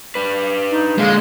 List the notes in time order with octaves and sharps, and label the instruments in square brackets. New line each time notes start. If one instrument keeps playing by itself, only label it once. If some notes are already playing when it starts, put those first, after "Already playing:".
[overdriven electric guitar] D4 B4
[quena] D#4
[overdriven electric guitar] A#2 D3 [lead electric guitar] G#3 [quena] F5